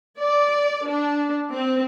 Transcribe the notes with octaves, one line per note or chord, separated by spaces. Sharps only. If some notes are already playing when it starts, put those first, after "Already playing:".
D5
D4
C4